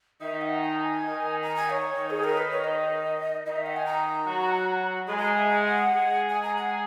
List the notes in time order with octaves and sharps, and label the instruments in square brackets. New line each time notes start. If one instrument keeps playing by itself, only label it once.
[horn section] D#3 D#4 [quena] E5
[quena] F#5
G#5
A#5
G#5
[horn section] D#3 D#4
[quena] A#5
G#5
C#5
[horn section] D#3 D#4
[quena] G#4
A#4
B4
C#5
D#5
[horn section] D#3 D#4 [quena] D#5
[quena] E5
F#5
G#5
A#5
[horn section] F#3 F#4
[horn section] G#3 G#4 [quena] B5
[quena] A#5
G#5
E5
F#5
[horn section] G#3 G#4
[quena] G#5
A#5
F#5
G#5